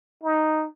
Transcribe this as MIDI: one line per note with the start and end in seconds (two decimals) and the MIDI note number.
0.23 0.66 63